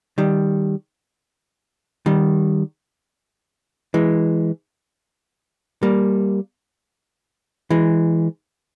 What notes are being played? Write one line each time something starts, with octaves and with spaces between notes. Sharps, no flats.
D#3 G3
D#3 G3
E3 G#3
G3 A#3
E3 G#3